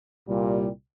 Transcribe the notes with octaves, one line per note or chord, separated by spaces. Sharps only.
C2 A#2 G3